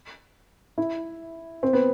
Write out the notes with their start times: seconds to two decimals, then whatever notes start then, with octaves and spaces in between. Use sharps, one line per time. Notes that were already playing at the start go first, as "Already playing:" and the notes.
0.78 E4
1.63 C4
1.73 B3